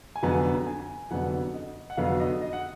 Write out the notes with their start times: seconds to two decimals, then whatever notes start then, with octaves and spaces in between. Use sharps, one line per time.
0.16 G#5
0.23 F1 F2 D3 F#3 B3 A#5
0.67 G#5
1.11 F1 F2 D3 F#3 B3 F#5
1.54 D#5
1.90 F#5
1.97 F1 F2 D3 F#3 B3 F5
2.20 D#5
2.42 D#5
2.53 F#5